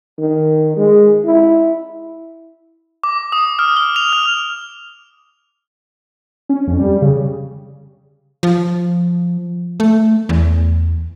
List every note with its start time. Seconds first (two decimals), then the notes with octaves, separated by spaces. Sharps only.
0.19 D#3
0.77 G#3
1.25 E4
3.04 D6
3.32 D#6
3.59 F6
3.77 G7
3.96 F7
4.13 F6
6.49 C#4
6.67 F2
6.79 G3
7.02 C#3
8.43 F3
9.80 A3
10.29 E2